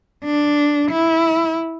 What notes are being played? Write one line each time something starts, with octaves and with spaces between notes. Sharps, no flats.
D4
E4